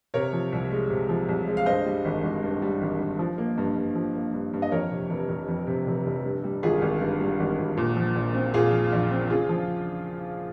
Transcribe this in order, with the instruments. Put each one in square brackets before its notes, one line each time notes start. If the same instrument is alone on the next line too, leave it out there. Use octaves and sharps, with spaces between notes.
[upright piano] C3 A#4 C#5
F3
C2
G#3
C3
F3
C2
G#3
F5
G2 C5 D#5
G3
G#1
G#1
G2
G3
G#1
G#1
F3
A#3
G2
G2
F3
A#3
G2
G2
D#5
F2 A#4 C#5
C3
F1
F1
F2
C3
F1
F1
G2
G3
G#1 F4 G#4
G#1
G2
G3
G#1
G#1
A#2
F3
A#1
C4
A#2 F4 G#4
F3
A#1
C4
C#3 F4 G#4
F3